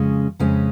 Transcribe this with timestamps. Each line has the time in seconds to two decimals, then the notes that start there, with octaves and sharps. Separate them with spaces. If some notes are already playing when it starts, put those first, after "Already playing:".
Already playing: F2 C#3 G#3 C#4
0.40 F2 C#3 G#3 C#4